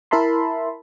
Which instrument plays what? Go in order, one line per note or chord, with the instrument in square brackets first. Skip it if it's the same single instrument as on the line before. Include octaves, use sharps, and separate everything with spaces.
[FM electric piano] E4 A#4 E5 A5 B5 C6